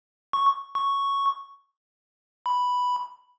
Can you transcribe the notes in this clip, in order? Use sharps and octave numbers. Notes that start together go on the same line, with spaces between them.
C#6
C#6
B5